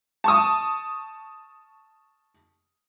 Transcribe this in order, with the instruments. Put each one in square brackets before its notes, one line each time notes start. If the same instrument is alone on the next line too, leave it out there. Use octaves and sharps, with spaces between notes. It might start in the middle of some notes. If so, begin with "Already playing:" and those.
[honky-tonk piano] A5 C#6 D#6